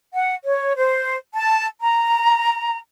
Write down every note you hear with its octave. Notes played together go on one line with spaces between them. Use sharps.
F#5
C#5
C5
A5
A#5